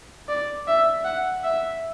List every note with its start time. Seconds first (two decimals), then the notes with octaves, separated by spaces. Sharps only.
0.29 D5
0.67 E5
1.04 F#5
1.44 E5